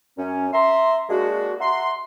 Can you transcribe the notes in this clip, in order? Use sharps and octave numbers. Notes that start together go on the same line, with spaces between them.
F#2 C#4
E5 A#5 C6
G#3 A#3 D4 F#4
E5 F#5 A#5 C6